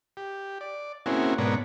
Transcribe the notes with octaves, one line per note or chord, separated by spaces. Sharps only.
G4
D5
A#3 C4 C#4 E4 F#4 G#4
G#2 B2 B3 D4 A#4 C#5